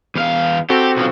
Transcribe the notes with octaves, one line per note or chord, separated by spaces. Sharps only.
E2 F5
C4 F#4 G4 A4
B1 F3